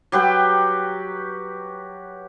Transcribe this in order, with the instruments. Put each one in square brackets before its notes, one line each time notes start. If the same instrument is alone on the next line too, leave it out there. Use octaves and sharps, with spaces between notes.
[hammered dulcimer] F#3 G4 B4 G5